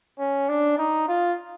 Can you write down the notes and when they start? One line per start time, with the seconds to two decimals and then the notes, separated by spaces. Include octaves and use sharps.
0.19 C#4
0.49 D4
0.78 D#4
1.08 F4